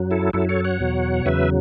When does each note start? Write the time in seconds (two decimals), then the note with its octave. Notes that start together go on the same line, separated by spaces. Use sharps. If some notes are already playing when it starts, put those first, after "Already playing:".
Already playing: F#2 F#3
0.11 E4 A4
0.33 F#2 F#3 E4 A4
0.49 A4 C#5
0.64 C#5 F#5
0.80 E2 B2 F#3
1.25 E2 C#3 F#3 B4 E5